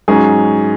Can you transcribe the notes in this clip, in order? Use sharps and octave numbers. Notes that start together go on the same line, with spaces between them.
G#2 F#3 C#4 G#4